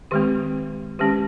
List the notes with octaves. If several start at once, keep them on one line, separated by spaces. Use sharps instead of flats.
D#3 G#3 C4 G4
D#3 G#3 C#4 G4